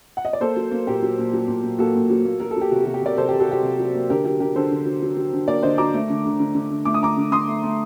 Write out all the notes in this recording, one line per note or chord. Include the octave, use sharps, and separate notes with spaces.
F#5
D#5
D5
A#3 A4 C5
F#3
A#3
A#2 G4 A#4
F#3
A#2
F#3
A#2
A#2
A#3 F#4 A4
A#2
F#3
A#3
F#3 A#4
A4
F#3 G4
C3 F#4
C3 F#4
G4
C3 A#4 D5
C3 A4 C5
C3 G4 A#4
F#4 A4
C3 G4
C3
F#3
A#3
D3 G4 A#4
F#3 G4 A#4
D3 G4 A#4
D3 A4 C5
D3
F#3
F#3
F#3
D3
A#3 A#4 D5
D3 C5 D#5
F#3 A#5 D6
A3
D3
D3
D3
D3
D3
A3 D6
D#6
D3 A#5 D6
D3
D3 C6 D#6
A3
A3